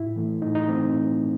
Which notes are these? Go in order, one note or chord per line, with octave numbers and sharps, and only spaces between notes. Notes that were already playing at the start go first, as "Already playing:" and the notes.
Already playing: A2 E4
E3 A3
A2 D#4
D#4
E3 A3 C4